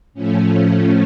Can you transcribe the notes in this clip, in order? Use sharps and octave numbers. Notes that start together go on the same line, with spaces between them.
A2 F3 A3 C#4